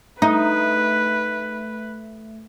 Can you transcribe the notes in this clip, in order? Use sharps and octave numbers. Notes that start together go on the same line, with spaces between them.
A3 D#4 B4